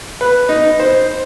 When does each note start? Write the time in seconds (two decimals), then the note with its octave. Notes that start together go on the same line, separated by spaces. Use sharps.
0.21 B4
0.49 D#4
0.79 C5